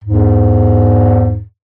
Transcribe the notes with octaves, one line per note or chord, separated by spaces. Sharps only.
E2 G#2